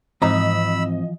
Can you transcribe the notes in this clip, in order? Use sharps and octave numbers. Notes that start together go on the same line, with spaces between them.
G#2 E3 F3 C4 D#5 A#5 B5 E6